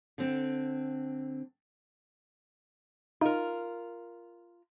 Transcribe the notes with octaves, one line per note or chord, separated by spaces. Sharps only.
D3 C4
D#4 F4 A#4